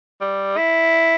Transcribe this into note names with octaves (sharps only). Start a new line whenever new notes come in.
G3
E4